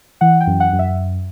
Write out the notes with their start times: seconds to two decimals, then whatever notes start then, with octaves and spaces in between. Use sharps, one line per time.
0.21 E3 F#5
0.41 G5
0.47 F#2
0.60 F#5
0.73 F#2
0.79 E5